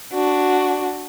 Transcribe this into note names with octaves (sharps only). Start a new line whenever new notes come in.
D4 F#4